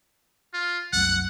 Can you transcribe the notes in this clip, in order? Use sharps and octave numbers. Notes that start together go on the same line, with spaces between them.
F4
C2 F#2 F#3 F#5